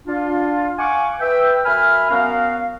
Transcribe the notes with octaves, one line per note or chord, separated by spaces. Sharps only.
D4 F4
F5 F#5 G#5 C#6 D6
B4 E5 G5
F#2 E5 G#5 B5 F6
F#2 B3 C#4 F#4 A#4 F5